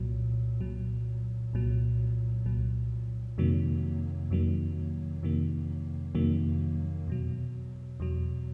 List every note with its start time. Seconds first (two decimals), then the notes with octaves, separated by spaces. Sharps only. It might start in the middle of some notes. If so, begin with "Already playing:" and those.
Already playing: C2 A#2 F#3
0.61 C2 A#2 F#3
1.53 C2 A#2 F#3
2.46 C2 A#2 F#3
3.38 F2 C3 D#3 F#3 A#3
4.30 F2 C3 D#3 F#3 A#3
5.23 F2 C3 D#3 F#3 A#3
6.15 F2 C3 D#3 F#3 A#3
7.07 E2 B2 F#3
8.00 E2 B2 F#3